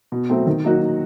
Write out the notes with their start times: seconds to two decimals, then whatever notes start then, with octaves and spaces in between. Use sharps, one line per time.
0.12 B2
0.30 F#3 A3 C4
0.47 D#3
0.64 F#3 A#3 D#4 F#4